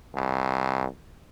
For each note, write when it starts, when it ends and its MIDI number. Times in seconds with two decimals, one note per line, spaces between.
0.15 0.85 36